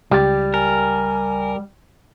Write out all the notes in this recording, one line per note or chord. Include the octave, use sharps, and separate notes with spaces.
C#2 G3 G4 A6
A#4 G#5